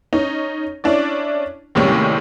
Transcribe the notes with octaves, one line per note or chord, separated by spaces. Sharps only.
C#4 D#4
C#4 D4 E4 D5
D#2 A2 C3 G3 G#3 C#4